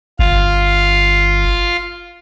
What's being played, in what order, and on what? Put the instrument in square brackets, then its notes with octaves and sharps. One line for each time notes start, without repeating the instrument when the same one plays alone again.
[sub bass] G1 [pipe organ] F4 F5